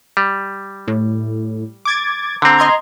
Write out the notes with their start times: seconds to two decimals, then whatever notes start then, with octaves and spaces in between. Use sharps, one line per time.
0.17 G3
0.88 A2
1.85 D6 G#6 A6
2.42 D3 C4 A#5
2.58 D#5 C6 G#6